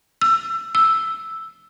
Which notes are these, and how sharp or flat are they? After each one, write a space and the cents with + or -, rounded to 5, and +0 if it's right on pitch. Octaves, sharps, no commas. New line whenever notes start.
E6 +25
E6 +0